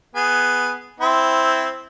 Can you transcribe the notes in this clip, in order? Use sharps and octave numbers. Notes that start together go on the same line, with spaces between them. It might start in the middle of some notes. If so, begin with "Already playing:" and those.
B3 G#4
C4 E4